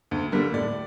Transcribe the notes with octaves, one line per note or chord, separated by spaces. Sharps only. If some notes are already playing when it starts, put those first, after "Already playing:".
D2
D3 G3 A#3
A2 D5